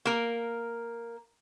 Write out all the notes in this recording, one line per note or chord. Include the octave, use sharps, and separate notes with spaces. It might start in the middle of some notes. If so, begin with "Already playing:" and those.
A#3 A#4